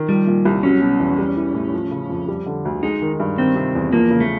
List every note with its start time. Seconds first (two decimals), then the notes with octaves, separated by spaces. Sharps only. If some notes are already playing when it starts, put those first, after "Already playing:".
Already playing: D#3
0.09 F3 G3
0.27 A#2
0.45 C2
0.63 F#3 C#4
0.81 B2
1.00 E2
1.18 G3
1.37 E3
1.54 A2
1.74 F3
1.91 C#3
2.10 F2
2.28 G3
2.46 D3
2.65 D2
2.83 G#3 D#4
3.02 D#3
3.20 G2
3.38 D#3 C4
3.56 C3
3.75 E2
3.93 F3 A#3
4.11 C#3
4.20 A3